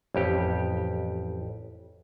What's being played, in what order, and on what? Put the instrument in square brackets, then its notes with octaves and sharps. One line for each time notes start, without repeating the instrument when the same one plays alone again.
[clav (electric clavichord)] A1 F2 G4